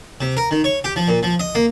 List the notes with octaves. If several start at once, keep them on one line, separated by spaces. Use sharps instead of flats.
C3
A#4
D#3
C#5
G4
F3
A#2
F3
D#5
A#3